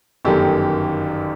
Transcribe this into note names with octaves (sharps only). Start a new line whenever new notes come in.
G1 F#2 D#3 G4 A4